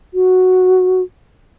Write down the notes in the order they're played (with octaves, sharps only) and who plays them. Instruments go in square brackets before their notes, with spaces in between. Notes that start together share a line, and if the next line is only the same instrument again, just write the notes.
[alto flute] F#4